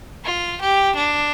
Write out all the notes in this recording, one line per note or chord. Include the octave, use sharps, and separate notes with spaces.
F4
G4
D4